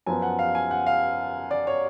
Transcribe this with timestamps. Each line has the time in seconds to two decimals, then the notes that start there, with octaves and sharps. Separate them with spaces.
0.06 F#2 F3 B3 G#5
0.22 F#5
0.39 F5
0.55 G#5
0.71 F#5
0.86 F5
1.51 D5
1.67 C#5